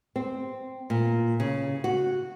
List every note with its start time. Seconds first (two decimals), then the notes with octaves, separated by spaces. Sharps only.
0.16 C4
0.90 A#2
1.40 C#3
1.84 F#4